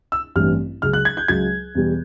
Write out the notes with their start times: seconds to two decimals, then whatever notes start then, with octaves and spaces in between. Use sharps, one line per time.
0.12 E6
0.35 A1 G2 E3 G3 C4 F6
0.82 C#2 C#3 F#3 F6
0.93 F#6
1.05 G#6
1.17 G6
1.28 C#2 C#3 F#3 G#6
1.75 E2 B2 G3